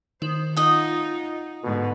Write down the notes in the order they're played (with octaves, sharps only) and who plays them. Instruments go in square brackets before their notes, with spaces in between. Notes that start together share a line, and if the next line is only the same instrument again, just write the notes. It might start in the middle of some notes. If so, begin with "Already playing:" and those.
[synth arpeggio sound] D#3 [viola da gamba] C5
[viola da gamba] D#4 F4 [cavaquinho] D#5 F#5
[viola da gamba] G#2 D3 [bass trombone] B2